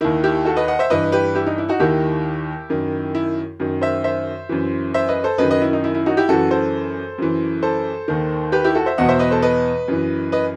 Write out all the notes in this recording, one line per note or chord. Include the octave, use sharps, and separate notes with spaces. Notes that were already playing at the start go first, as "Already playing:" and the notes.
D#2 D#3 E4
E4 G4
F#4 A4
B4 D#5
D#5 F#5
C5 E5
G2 E3 B4 D#5
G4 B4
E4 G4
D#4
E4
D#4 F#4
D#2 D#3 E4 G4
F#2 D#3
E4
F#2 D#3
C5 E5
C5 E5
F#2 E3
C5 E5
B4 D#5
A4 C5
F#2 D#3 B4 D#5
B4 D#5
E4
D#4
E4
E4
D#4 F#4
E4 G4
F#2 E3 F#4 A4
A4 C5
F#2 E3
A4 C5
D#2 D#3
G4 B4
E4 G4
F#4 A4
C5 E5
E2 B2 D#5 F#5
C5 E5
B4 D#5
A4 C5
B4 D#5
F#2 E3
B4 D#5